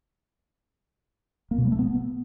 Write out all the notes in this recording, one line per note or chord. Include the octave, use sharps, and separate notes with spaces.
A#3
B2
G3
A3
B3